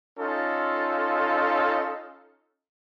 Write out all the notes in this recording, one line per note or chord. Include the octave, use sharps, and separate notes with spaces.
C#4 D#4 F4 A4